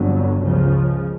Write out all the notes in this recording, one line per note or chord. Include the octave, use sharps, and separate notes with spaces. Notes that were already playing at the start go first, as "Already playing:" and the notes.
Already playing: G1 F2 D3 F#3
C#2 C#3 F3